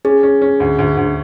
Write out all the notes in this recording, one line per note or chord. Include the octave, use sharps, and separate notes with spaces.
C#4 G#4
C#4
C#4
D2
D2
D2